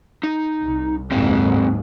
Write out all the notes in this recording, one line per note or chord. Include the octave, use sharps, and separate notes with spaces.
D#4
C2
F#1 D#2 G#2 C4 G4 A4